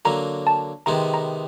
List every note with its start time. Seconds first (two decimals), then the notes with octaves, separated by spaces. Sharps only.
0.05 D3 F#3 A#3 A#5
0.47 A5
0.86 C3 D#3 G#3 B3 A#5
1.14 A#5